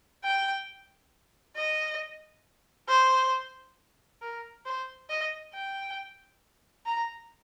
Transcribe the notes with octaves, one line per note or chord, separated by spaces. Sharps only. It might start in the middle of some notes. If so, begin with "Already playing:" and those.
G5
D#5
C5
A#4
C5
D#5
G5
A#5